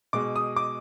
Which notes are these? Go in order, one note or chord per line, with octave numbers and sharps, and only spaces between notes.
B2 G#3 D6
D#6
D6